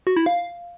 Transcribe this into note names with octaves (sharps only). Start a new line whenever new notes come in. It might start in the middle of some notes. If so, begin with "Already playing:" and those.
F#4
E4
F5